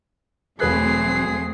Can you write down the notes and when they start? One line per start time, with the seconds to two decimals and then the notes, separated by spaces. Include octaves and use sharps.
0.60 E1 F#3 A3 C4 G#4 B4 F#6 C7